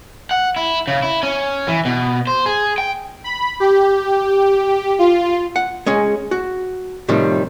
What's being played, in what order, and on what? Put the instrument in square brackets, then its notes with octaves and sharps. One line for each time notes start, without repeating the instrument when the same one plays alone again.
[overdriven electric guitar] F#5
E4
C#3
E4
C#4
E3
B2
C5
G#4
G5
[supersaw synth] B5
G4
F4
[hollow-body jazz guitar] F#5
G#3 C#4 G#4
F#4
A2 C3 D#3 F3 G3